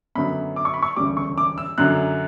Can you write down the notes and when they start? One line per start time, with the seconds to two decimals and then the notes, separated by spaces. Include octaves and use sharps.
0.15 F#2 D3 F#3 B3 B5
0.56 D6
0.65 C#6
0.74 B5
0.82 C#6
0.96 E1 D2 C#3 G3 D6
1.17 C#6
1.38 D6
1.58 E6
1.78 F#2 D3 F#3 F#6